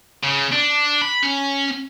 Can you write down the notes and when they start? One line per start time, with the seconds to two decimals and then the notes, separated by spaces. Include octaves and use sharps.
0.24 C#3
0.53 D4
1.02 B5
1.23 C#4